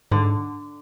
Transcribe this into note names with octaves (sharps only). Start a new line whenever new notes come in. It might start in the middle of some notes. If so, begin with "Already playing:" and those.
G#2 D3